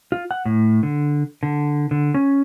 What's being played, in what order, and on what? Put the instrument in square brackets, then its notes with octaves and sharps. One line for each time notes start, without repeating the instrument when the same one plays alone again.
[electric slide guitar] F4
F#5
A2
D3
D3
D3
C#4